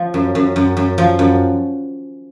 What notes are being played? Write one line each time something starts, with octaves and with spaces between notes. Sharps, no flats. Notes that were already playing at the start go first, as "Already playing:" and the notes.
Already playing: F3
F#2
F#2
F#2
F#2
F3
F#2